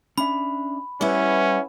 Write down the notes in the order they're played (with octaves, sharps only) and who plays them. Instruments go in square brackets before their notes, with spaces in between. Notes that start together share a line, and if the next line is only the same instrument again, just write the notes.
[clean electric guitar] C#4 D4 E5 [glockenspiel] B5
[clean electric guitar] G3 B4 [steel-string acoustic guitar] B3 E4 [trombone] C#4